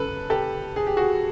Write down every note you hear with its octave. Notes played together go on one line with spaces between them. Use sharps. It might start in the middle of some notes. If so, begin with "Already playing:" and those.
Already playing: F#2 C#3 A4 B4
G4 A4
G#4
G4
F#4 G#4